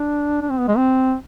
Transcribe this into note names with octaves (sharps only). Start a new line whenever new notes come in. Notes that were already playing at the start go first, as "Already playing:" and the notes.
Already playing: D4
D4
C4
B3
G#3
C4